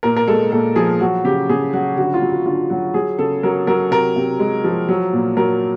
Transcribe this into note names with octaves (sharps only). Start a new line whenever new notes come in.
A#2 A#4
A#4
G#3 A4
A#2 A4
F3 G#4
F#3 F#4
C#3 G4
C#3 G#4
F#3 F#4
D3 F#4
F4
F#3
F#4
D3 F4
F#3 F#4
F#3 G#4
C#3 A4
F#3 A#4
F#3 A#4
C3 A#4
C3
G#3
F3
F#3
A#2
F#3 A#4